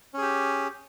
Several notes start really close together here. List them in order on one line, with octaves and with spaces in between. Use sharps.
C#4 G#4 G4